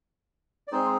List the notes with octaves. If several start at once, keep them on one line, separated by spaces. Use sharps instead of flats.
D5
G#3 C4 D#4 G#4 C5